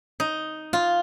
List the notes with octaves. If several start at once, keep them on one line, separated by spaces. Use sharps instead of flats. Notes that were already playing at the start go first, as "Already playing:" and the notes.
D#4
F4